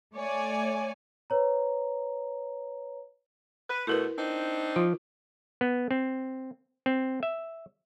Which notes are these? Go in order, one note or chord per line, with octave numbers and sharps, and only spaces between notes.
A3 C#5 D5 G#5
B4 C#5 A#5
B4
B2 A3 E4 A#4 B4
C4 D4 D#4
F3 F4
B3
C4
C4
E5